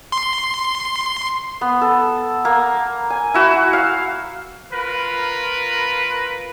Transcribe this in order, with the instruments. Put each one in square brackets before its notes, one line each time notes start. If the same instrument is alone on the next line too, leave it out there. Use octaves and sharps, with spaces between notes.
[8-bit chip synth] C6
[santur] B3
A4
A#3
G#5
E4 F#4
F5
[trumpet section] F4 A#4 B4